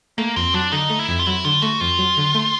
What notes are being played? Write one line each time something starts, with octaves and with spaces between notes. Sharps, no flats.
A3 A#3
F2 C4
F#3 D4
D3 D#4
A3
E4
F2
F4
F#3 E4
D3 F4
A3 F#4
F2 F4
F#3
D3
A3